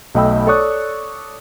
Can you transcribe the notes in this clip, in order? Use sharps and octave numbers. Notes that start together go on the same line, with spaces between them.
B1 A3 D#5 G5 B5 E6
A4 C#5 D5 C#6 D#6 F#6